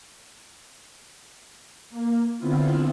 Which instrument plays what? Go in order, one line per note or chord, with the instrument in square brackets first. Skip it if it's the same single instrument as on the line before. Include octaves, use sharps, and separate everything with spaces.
[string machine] A#3
D3 B3 C4 E4 F4